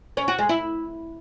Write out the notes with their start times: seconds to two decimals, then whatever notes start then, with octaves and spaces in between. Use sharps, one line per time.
0.17 C#4
0.28 F#4
0.39 G#3
0.49 E4